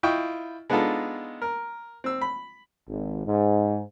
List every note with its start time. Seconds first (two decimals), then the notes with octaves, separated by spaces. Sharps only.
0.03 E4 F4 D#5 G5 C#6
0.70 G#3 B3 D4 D#4 F4 A4
1.42 A#4
2.04 C4 E6
2.21 B5
2.87 G#1
3.25 G#2